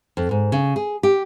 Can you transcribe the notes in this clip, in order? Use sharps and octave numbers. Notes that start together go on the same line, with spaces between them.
F2
G#2
C#3
G#4
G4